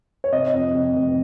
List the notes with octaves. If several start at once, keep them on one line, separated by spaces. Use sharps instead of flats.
C#5
C3 D#5
F2
C3
F1